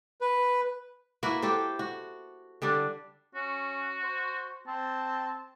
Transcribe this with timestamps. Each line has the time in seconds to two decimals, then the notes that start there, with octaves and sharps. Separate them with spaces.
0.21 B4
1.23 A#3 E4 F#4 B4
1.42 G4 A4 C5
1.79 F#4
2.62 D3 G3 D4
3.35 C#4 F#4
4.03 C5
4.67 C4 A5